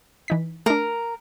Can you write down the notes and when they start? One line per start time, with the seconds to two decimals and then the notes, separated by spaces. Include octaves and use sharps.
0.28 E3 D#4 B6
0.66 A3 D4 A#4